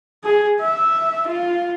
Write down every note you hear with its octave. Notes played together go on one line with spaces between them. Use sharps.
G#4
E5
F4